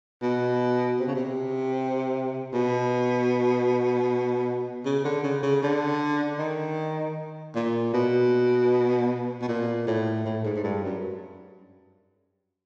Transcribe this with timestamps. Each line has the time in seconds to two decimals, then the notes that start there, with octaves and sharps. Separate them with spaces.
0.22 B2
0.99 C3
1.08 C#3
1.15 C3
2.53 B2
4.85 C#3
5.04 D3
5.23 C#3
5.42 C#3
5.63 D3
6.39 D#3
7.56 A#2
7.93 B2
9.41 B2
9.48 A#2
9.87 A2
10.25 A2
10.45 G#2
10.56 G#2
10.63 G2
10.84 F#2